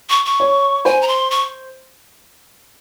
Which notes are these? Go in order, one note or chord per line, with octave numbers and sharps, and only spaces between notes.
C#6
C#6
C#5
C5 G#5
A#5
C6
C#6